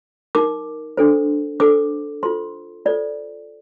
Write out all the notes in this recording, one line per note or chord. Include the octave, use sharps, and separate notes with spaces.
D#4 A#4 D6
D4 A4 C5
D4 A4 C5 D6
F4 A4 C5 C6
F4 A4 C5 D5